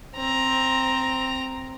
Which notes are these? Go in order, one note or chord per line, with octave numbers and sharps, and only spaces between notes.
C4 A#5